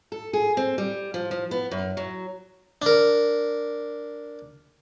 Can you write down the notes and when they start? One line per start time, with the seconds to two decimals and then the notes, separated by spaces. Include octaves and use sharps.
0.12 A4
0.33 G#4
0.57 C4
0.78 G3
1.14 F3
1.31 F3
1.51 B3
1.71 F#2
1.97 F#3
2.82 D4 A#4